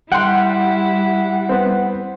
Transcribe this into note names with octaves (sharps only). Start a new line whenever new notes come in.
G3 E4 F#5 G5 C6
B3 C4